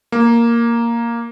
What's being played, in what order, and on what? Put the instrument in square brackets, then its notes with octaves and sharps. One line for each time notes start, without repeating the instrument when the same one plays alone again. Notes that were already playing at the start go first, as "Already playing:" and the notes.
[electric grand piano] A#3